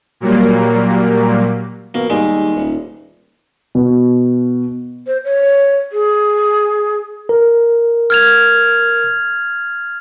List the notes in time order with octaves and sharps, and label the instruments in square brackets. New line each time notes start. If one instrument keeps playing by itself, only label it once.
[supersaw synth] A#2 F#3 G3 A#3
[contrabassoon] B2 [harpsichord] A#3
[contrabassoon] D#2 [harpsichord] G3 G#3
[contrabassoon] D#1
[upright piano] B2
[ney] C5
C#5
G#4
[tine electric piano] A#4
[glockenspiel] F6 G#6 F7